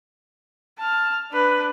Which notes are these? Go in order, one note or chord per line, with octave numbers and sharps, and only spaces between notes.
A5 F6
D4 B4